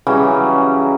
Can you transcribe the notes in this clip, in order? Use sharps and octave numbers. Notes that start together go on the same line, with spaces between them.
C#3 E3 F#3 G3